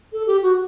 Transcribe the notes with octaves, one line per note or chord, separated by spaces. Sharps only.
A4
G4
F#4